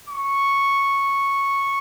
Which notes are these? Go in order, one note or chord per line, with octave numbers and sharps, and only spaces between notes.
C#6